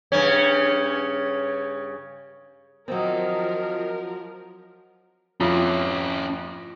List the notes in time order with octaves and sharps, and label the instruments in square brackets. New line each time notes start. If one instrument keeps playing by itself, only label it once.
[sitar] G2 C#3 C#4
[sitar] D#3 A#3 [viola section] F3 A#4 [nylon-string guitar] F#3 C4
[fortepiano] F2 [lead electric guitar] C#4 E4